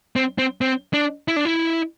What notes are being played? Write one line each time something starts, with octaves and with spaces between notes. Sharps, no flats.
C4
C4
C4
D4
E4
D4
E4